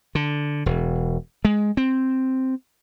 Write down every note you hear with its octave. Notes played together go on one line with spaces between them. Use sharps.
D3
E1
G#3
C4